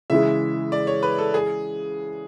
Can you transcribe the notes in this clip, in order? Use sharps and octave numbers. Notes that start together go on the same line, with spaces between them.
C#3 E3 G#3 E5
D5
C#5
B4
A4
G#4